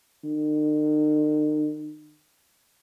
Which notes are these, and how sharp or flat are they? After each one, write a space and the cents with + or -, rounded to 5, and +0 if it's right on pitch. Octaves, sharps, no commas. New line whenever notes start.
D#3 -45